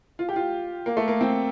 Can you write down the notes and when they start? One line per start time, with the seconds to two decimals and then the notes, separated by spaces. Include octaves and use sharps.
0.19 F4
0.29 G4
0.36 F4
0.86 A#3
0.97 A3
1.08 A#3
1.21 C4